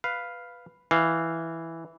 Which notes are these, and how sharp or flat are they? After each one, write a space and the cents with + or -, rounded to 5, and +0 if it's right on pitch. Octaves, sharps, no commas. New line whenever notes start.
B4 +0 F5 +0
E3 +0 F5 +0